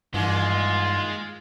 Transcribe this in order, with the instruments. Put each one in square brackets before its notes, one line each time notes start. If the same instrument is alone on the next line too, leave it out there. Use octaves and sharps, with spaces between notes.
[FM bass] G2 [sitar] A#2 D#3 E3 [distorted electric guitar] G#3 [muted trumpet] F4